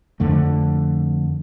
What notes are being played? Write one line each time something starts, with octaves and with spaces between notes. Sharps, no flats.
F2 D3 A3